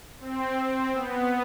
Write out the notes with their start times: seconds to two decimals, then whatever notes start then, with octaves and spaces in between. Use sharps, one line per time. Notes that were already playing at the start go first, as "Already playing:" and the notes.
0.20 C4
0.56 C4
0.93 B3